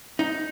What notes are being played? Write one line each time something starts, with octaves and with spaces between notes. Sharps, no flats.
D#4